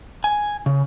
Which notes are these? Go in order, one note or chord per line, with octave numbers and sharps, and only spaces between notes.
G#5
C#3